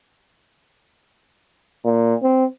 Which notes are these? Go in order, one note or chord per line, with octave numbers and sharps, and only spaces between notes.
A#2
C4